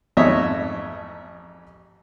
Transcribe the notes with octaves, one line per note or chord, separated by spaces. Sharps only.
A1 F2 G#2 C#5 D#5 E5